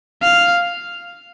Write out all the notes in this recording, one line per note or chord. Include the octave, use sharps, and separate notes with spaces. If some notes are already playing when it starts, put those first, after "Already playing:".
F5